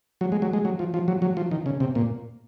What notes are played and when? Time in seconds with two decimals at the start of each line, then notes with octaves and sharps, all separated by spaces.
0.21 F#3
0.32 G#3
0.42 F#3
0.53 G#3
0.65 F#3
0.79 F3
0.94 F3
1.08 F#3
1.22 F#3
1.37 F3
1.51 D#3
1.66 C#3
1.80 C3
1.95 A#2